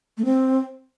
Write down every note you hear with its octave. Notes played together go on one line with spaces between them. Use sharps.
A3
C4